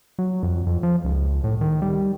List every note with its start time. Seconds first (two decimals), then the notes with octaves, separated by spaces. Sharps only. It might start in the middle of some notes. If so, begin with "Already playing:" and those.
0.19 F#3
0.43 F2
0.66 F2
0.83 F3
1.04 C#2
1.44 A2
1.61 D#3
1.82 G3